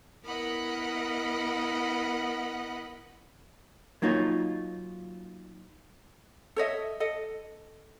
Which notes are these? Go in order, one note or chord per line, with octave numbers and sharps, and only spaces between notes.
B3 E4 A#4 D#5 F#5 B5
F#3 A#3 D#4 F4 C#5
A4 C#5 D#5 E5
A4 D#5